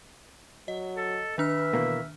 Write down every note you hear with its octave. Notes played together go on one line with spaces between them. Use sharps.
F#3 D#5
A4
D#3 D4 B4 E5 F6
B2 E3 A#3